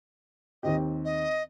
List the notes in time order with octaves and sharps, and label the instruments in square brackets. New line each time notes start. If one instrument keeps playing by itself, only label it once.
[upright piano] D#2 D#3 C4 G4 [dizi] D#5
[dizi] D#5